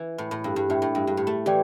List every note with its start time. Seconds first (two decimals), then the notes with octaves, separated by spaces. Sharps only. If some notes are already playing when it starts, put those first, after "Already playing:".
Already playing: E3
0.18 A2
0.31 A2
0.44 G2
0.56 G2
0.69 A2 D4 G4 E5 G5
0.82 A2
0.95 G2
1.07 G2
1.17 A2
1.27 A3
1.46 E3 G4 D5 G5